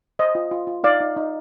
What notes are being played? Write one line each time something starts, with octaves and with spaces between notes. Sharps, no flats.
C5 D#5
F4
F4
F4
D#4 D5 F5
D#4
D#4